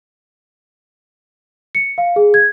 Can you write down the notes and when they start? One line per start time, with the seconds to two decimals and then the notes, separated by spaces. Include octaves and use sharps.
1.75 C#7
1.98 F5
2.16 G#4
2.34 G#6